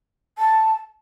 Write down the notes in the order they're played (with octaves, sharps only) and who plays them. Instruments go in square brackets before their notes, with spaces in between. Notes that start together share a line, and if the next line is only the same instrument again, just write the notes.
[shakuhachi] A5